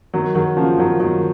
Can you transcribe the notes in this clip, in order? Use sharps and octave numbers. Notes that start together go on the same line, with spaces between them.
D#3 F#3
D#3 F#3
C#3 F3
D#3 F#3
D#3 F#3